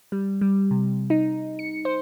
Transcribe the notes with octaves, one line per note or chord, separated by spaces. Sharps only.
G3
G3
C3
D#4
C#7
C5